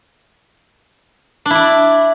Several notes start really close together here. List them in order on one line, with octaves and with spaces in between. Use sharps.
D4 E4 D5